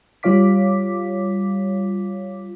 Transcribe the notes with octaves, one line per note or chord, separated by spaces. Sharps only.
G3 F4 C#5 F5 D6 B6